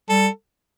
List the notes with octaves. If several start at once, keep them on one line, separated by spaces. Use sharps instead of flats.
G3 A4